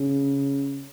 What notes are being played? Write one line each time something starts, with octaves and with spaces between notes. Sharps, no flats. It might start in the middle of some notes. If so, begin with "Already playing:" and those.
Already playing: C#3